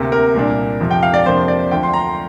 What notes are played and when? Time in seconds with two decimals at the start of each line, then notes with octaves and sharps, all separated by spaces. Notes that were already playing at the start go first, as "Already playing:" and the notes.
Already playing: D2 C3 A#3
0.12 A#4
0.34 C2 A#2 A#3 D4
0.80 F2 C3 F3
0.91 G5
1.03 F5
1.14 D5
1.26 F2 C3 A#3 D4 C5
1.48 D5
1.71 D2 D3 F3 G5
1.83 C6
1.93 A#5